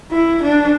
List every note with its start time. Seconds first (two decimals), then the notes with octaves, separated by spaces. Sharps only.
0.11 E4
0.43 D4